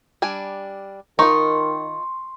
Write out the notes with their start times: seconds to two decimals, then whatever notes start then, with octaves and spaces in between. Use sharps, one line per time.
0.22 G3 D4 G#5
1.19 D#3 D#4 F4 C6 C#6